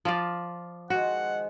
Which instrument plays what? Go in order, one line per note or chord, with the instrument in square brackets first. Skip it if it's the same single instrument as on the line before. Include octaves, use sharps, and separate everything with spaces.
[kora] F3 F4 D5
[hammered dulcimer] D#3 F3 G#3 [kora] F#4 [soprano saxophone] F#5